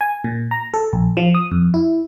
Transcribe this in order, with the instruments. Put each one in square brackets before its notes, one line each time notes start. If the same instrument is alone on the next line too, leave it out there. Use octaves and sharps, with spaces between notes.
[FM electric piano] G#5
A#2
A#5
A4
A#1
F3
D#6
F2
E4